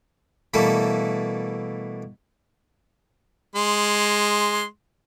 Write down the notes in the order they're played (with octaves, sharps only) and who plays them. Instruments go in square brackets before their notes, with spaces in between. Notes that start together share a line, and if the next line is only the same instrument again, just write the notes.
[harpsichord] B2 E3 G3 A3 A#3 A4
[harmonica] G#3 C6